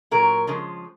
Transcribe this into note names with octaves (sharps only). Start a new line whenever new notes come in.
A#2 F#3 A#4
C#3 F3 G#3